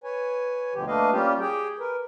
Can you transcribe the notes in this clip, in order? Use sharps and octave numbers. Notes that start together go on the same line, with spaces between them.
B4 C#5 G#5
D2 B2 D3 F3 G4
A3 A#3 D4 B4 D#5 F5
G3 A#3 C#4 F4 G4
G4 G#4 G5
A#4 B4